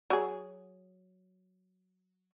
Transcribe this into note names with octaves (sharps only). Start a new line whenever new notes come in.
F#3 G#4